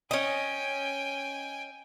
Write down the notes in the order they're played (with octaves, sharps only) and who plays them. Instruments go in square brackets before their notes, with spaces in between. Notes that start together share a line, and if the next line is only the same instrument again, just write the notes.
[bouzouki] C#4 D#5 [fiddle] G5 G#5